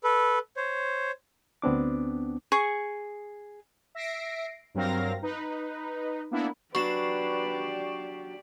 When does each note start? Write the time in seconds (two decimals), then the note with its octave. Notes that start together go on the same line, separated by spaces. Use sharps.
0.04 A4 B4
0.57 C5 C#5
1.62 D2 B3 C4 D4 D6
2.52 G#4 C#6
3.95 E5 A#6 C7 D7
4.74 G2 F#3 C4 A#4 F5 A#6
5.22 D#4 B4
6.31 A#3 B3 D4 E4
6.75 F#3 D4 G4 B4 D5 C#6 C7 E7